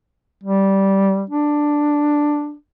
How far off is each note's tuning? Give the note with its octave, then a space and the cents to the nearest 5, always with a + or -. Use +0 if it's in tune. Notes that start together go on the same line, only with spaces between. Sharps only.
G3 -10
D4 +5